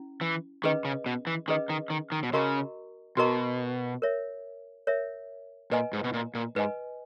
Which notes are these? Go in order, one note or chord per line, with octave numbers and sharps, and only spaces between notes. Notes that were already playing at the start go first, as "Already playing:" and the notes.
Already playing: C#4 E4
E3
D#3 C#4 G#4 B4 D#5
C#3
B2
E3
D#3 C#4 G#4 B4 D#5
D#3
D#3
D#3
B2
C#3 F#4 A#4 D#5 A#5 C#6
B2 F#4 A#4 D#5 A#5 C#6
A#4 C#5 E5
A#4 C#5 E5
A#2 B4 D#5 G#5
G#2
B2
A#2
A#2
G#2 B4 D#5 G#5